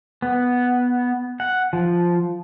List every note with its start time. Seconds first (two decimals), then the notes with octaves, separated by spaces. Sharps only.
0.22 B3
1.40 F#5
1.73 F3